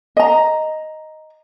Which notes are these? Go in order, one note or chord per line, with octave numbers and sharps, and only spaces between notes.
D#5 A#5